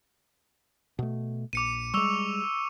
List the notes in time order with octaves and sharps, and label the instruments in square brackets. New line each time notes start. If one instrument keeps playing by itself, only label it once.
[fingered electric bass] B2 A3
[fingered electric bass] A#1 [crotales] D6 C#7 D#7
[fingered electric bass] G3 G#3 [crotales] C#6 E6 F7